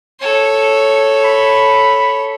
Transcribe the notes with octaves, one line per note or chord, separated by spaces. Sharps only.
A4 C#5
B5